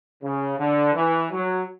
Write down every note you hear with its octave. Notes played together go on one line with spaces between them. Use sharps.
C#3
D3
E3
F#3